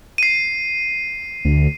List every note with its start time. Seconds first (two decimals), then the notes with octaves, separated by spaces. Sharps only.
0.18 C7 D#7
1.45 D2